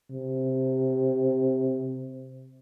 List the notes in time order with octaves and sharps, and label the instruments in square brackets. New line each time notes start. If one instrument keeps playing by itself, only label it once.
[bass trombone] C3